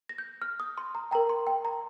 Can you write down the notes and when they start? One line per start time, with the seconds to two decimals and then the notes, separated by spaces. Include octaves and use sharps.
0.09 A#6
0.18 G6
0.42 F6
0.60 D#6
0.77 C6
0.95 A#5
1.11 A#4 G5 A#5
1.29 C6
1.47 G5
1.65 A#5